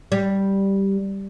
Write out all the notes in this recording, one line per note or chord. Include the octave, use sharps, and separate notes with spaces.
G3